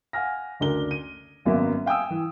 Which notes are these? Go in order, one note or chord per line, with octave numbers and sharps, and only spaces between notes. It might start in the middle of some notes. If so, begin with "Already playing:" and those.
F5 F#5 G#5 F6 A#6
F#1 D2 D4 A#4 G7
D#7
G#1 F#2 A#3 B3 E5
F5 G5 G#5 D#6 E6
E3